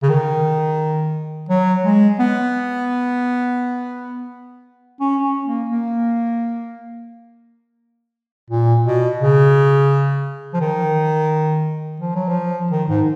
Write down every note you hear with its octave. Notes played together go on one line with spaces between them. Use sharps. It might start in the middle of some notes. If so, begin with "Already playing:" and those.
C#3
D#3
F#3
G#3
B3
C#4
C#4
A#3
A#3
A#2
B2
C#3
F3
D#3
F3
F#3
F3
D#3
G#2